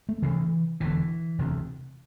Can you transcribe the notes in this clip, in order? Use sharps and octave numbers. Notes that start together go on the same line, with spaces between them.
A3
D2 C3 E3
E1 E2 D3 E3
E1 D2 C3